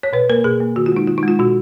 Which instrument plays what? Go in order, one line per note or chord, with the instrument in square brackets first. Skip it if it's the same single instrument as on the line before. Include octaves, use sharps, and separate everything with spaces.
[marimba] C#5
B2 B4
A#3 A#4
B2 G#4
A#3
D#3 F#4
F4
G#3 D#4
D#3 F4
D#4
G#3
F4
B2 F#4